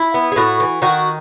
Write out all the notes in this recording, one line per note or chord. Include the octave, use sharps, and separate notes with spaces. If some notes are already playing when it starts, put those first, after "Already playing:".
Already playing: E4
B3
G#4
A2 F#4
E3
D#3 F#4